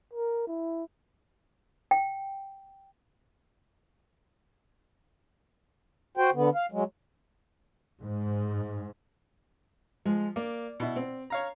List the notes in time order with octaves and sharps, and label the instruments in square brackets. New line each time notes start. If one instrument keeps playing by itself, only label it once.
[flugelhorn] A#4
E4
[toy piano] G5
[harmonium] F#4 C5 G5
D3 B3
F5
F#3 G#3
[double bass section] G#2
[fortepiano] F3 [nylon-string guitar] G#3
[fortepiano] A#3 [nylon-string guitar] D5
[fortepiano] B2 E4
C4
C#5 F5 A#5